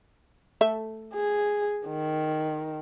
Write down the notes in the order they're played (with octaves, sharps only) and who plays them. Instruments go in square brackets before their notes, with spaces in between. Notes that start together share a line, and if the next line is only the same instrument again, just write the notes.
[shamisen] A3 A4 E5
[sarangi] G#4
D#3